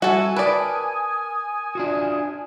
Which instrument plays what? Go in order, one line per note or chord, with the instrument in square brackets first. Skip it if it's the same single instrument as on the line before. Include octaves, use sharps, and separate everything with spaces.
[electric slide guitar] G3 E5 [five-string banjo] F#4 A4 [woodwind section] G#5 [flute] E6
[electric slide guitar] A#4 G5 A5 [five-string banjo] B4 D5 [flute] D#6
[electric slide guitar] D4 F4 F#4